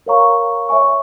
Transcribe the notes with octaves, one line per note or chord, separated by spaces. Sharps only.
A#4 C#5 F5 A#5 C#6
C#5 E5 G#5 C#6